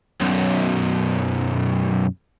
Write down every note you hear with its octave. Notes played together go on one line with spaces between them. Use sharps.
B1 F#2